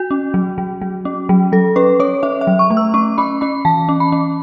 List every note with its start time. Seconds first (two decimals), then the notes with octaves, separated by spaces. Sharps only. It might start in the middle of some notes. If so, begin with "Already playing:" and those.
Already playing: F#4
0.11 C#4
0.34 F#3
0.58 F#3
0.81 F#3
1.05 C#4
1.29 F#3
1.52 F#3 A4
1.76 C#4 B4
2.00 C#4 C#5
2.23 C#4 E5
2.41 E5
2.47 F#3
2.59 C#6
2.70 A3
2.77 E6
2.94 C#4 C#6
3.18 C#4 B5
3.41 C#4 B5
3.65 E3 A5
3.89 C#4
4.00 B5
4.12 C#4